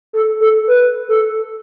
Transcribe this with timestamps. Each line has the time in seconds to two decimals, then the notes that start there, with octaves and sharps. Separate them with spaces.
0.13 A4
0.41 A4
0.68 B4
1.09 A4